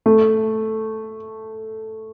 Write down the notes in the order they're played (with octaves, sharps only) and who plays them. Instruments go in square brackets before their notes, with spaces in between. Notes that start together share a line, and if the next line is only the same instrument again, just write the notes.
[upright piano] A3